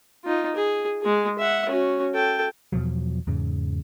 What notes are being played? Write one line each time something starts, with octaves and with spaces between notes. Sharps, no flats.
D#4 F4
G#4
G#3 G#4
E5 F#5
C#4 F#4
A4 G5
E2 B2 F3 F#3
E2 G#2 C#3